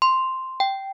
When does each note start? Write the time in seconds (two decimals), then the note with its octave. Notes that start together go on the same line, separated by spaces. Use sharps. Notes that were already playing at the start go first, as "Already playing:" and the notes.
0.02 C6
0.60 G5